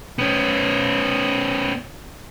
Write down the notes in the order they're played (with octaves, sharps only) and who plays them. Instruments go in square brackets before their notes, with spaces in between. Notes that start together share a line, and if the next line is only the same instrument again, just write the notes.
[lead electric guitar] B3 C#4